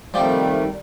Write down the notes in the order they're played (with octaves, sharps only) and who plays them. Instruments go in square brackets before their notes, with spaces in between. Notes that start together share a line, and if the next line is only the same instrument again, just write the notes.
[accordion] C3 D#3 A3 [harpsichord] F3 G4 [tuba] G3 [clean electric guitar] D5 G5